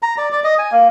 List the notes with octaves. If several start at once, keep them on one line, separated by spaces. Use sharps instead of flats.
A#5
D5
D5
D#5
G#5
A#3